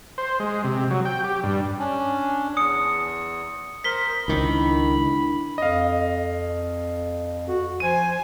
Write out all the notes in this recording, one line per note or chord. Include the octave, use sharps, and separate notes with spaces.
C5
G#3
C3
F#3
G5
G4
G2
C#4 D4
E2 D#6 C#7
A#4 C5 B6 G7
C#2 D#3 D4 E4 B5
F2 D#5 F5
F#4
F3 C5 G#5 D#7